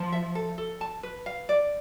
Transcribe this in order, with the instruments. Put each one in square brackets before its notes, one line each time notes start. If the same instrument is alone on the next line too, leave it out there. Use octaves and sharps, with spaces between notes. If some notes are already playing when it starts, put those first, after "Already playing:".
Already playing: [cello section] F3 [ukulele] A5
[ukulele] E5
A4
A4
A5
B4
F5
D5